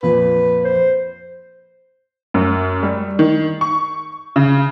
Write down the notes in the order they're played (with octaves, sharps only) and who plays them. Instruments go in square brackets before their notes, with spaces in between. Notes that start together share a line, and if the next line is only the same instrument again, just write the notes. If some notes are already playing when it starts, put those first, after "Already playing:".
[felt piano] F2 A#2 [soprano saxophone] B4
[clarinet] C5
[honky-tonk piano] F#2
G3
D#3
C#6
C#3